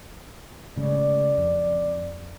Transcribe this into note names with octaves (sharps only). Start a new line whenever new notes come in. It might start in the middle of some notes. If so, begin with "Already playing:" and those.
A2 C#3 G#3 D5
F2